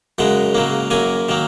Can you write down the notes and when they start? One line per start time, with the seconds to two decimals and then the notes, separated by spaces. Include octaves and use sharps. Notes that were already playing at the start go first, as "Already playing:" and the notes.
0.18 F#2 C#3 G#3 F#5
0.55 C#3 F#3 A#3
0.90 F#2 F#3 A#3 G#5
1.29 D#3 F#3 A#3